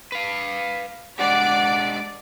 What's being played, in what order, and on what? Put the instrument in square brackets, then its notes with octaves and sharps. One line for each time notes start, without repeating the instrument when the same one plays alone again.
[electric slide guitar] B4 F5
[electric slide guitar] G#3 D4 G4 [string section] D5 [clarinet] F#5